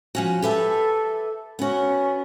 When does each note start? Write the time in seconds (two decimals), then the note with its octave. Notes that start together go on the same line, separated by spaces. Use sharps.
0.15 F3 C#4 F#4
0.42 G4 A4 B4 E5
1.59 B3 C#4 F#4